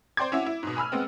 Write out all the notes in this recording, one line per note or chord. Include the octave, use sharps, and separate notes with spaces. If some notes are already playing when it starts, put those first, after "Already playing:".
C5 D5 G5 C6 D6 G#6
C#4 E4 F#4 E5
E4
G#2 B2
G#5 B5 E6 F6
G#3 B3 C4